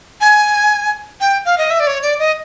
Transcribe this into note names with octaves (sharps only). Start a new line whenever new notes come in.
G#5
G5
F5
D#5
E5
D5
C#5
D5
D#5